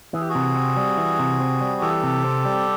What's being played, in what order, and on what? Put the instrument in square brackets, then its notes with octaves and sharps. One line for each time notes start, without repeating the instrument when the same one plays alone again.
[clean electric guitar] E3 [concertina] G#4
[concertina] G4
F#4 G#4
[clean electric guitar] C3
C4
G3
E3
C3
C4
G3
[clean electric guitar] E3 [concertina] G4 A4
[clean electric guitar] C3
C4
G3